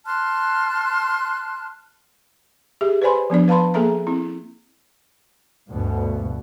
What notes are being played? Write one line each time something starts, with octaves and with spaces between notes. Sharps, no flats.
A5 C6 F6 F#6
G4 G#4 E5
B4 C5 D5 G#5 B5 C6
F3 B3 D4 D5
B4 F5 A5 B5 C6
A#3 G#4 A4 E5 A#5
C4 E4
D2 G2 B2